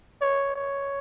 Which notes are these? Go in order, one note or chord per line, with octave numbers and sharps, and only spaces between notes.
C#5
C#5